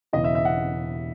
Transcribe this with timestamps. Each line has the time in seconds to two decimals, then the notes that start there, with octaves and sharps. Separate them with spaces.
0.13 E1 E2 C#3 E3 D#5
0.24 E5
0.35 E5
0.45 F#5